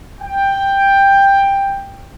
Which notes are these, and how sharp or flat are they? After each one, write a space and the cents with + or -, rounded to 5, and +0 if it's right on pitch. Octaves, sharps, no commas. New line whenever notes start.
G5 +10